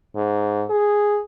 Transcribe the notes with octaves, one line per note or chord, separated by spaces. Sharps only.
G#2
G#4